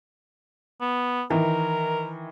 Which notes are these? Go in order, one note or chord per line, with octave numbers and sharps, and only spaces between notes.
B3
D#3 E3 A#4